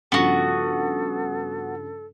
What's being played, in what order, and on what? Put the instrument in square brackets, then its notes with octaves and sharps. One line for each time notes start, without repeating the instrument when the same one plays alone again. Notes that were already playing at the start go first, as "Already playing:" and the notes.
[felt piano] G2 C#3 F3 [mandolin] B3 F#4 [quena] A4